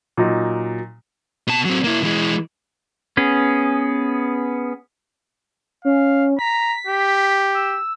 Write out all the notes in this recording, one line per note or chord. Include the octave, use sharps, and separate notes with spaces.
A#2 F#3 D#4
B2 A5
F#3 C4
A#3 E4
E3 G#3
B3 C#4 G#4
C#4 F5
A#5 B6
G4
E6